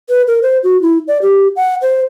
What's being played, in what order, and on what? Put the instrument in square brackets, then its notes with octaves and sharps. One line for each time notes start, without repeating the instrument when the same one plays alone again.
[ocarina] B4
A#4
C5
F#4
E4
D5
G4
F#5
C5